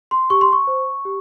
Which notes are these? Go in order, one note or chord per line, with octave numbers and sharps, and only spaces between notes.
C6
G4 C#6
C6
C#6
C5
G4